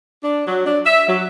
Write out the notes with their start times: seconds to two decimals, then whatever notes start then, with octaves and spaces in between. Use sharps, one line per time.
0.23 D4
0.46 F#3
0.65 D4
0.86 E5
1.08 F#3